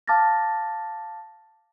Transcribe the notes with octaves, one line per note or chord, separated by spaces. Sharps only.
F5 A5 D6 F6 A6 A#6